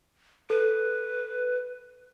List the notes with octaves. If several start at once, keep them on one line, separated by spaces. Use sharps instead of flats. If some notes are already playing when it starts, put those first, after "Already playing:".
A4 B4